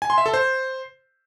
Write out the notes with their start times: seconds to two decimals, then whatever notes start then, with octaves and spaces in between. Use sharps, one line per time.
0.02 G#5
0.10 C6
0.18 E5
0.26 A4
0.34 C5